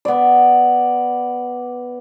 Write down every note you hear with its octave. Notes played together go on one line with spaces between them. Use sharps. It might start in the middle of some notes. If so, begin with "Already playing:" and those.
B3 D5